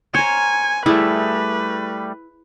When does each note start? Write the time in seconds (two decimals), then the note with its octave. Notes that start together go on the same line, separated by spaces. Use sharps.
0.15 A#4 C5 C#5 G#5
0.86 G3 A3 E4 G#4 B4 D6